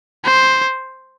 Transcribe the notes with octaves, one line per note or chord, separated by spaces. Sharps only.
C5